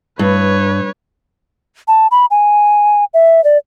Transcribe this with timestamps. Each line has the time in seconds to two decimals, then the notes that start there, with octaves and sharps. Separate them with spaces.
0.19 G2 B4 C#5
1.88 A5
2.11 B5
2.31 G#5
3.14 E5
3.44 D5